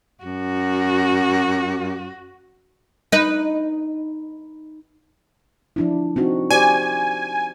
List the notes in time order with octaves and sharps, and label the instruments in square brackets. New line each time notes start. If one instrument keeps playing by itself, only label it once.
[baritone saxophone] F#2 [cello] F#4
[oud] D#4 B4
[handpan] F3 D4 E4
C4 D#4 F#4
[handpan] G4 C5 D5 [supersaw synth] G#5